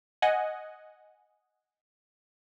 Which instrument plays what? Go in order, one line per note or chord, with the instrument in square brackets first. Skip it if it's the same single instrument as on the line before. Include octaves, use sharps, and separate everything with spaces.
[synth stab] D#5 F#5 G#5